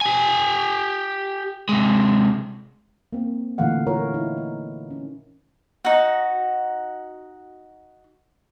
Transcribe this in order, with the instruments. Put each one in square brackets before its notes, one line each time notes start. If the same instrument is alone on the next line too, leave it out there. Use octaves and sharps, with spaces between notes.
[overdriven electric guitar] G4 G#5
C3 G#3
[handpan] A#3 C4
A#2 D3 E3 A3 F5 F#5
E4 F4 A#4 C#5
D#4 E4
D#4
C#4
[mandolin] D#4 F#4